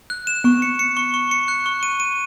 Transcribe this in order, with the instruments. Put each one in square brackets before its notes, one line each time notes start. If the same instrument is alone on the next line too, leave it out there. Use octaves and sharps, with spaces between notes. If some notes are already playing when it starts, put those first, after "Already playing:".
[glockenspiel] F#6
E7
[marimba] B3 [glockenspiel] C#6
[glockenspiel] C#7
C#7
C#6
C#6
C#7
F#6
C#6
D#7
D#7